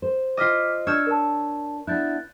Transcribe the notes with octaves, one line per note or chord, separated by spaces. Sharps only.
C5
F4 D#5 D6 F6 B6
D4 C#5 E6 F6 G6 G#6
A#4 A5
B3 D4 E4 F#6 G6 A6